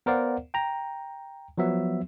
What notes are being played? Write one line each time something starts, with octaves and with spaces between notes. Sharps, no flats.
B3 A#4 C5 D5 F5 F#5
G5 A#5
F3 F#3 B3 E5